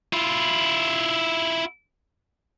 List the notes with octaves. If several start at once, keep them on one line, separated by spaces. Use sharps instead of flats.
E4 F4